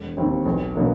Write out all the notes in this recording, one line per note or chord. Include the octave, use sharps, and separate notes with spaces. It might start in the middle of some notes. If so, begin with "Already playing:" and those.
Already playing: E1
D#2 D#3 G3 C4
B1
B2 F#3 A#3 D4